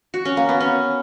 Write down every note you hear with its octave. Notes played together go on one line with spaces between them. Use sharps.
F#4
C#4
A#3
B3
C#4